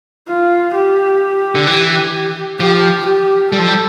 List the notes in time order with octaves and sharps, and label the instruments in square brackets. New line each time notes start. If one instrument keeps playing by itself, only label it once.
[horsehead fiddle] F4
G4
[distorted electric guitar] D3
E3
[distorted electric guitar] F3 [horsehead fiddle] G4
[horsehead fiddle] G4
[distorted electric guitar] G3 [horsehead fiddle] A4
[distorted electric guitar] F3
G3